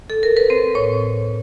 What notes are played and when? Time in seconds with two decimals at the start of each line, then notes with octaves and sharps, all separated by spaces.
0.10 A4
0.23 A#4
0.37 B4
0.50 C4 C5
0.75 A2 C#5